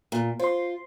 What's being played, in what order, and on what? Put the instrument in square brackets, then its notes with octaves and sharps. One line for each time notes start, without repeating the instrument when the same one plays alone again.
[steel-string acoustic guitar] A#2
[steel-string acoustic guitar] F4 [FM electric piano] C5 C6